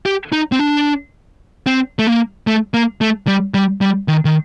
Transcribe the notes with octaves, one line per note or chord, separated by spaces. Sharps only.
G4
D#4
C4
D4
C4
A3
A#3
A3
A#3
A3
G3
G3
G3
D#3
D#3